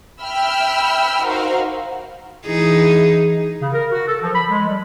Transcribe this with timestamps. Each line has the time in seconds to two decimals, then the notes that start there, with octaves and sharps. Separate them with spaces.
0.22 E5 G5 B5 E6 F6
1.24 D#4 F#4 A#4 C5 F5
2.46 E3 D#4 G#4
3.61 C#3
3.73 A#4
3.92 F#4
4.07 A4
4.22 F3
4.34 B5
4.50 G#3
4.67 G3